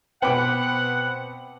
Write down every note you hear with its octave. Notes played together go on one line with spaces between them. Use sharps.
B2 B3 C4 F#5 G5 B5 D6 F#6